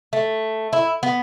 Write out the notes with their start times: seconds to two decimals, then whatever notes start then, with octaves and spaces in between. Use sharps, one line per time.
0.13 A3
0.73 E4
1.03 B3